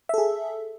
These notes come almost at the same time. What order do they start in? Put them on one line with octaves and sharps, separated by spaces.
E5 A4 G#4